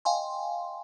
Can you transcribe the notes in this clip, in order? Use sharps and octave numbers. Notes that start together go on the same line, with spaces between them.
D#5 F5 G5 G#5 C6